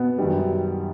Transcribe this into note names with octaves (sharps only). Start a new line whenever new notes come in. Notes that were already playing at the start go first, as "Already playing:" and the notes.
Already playing: B2 B3
F#2 D#3 G3